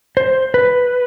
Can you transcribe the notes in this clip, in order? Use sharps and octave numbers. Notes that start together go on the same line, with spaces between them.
C5
B4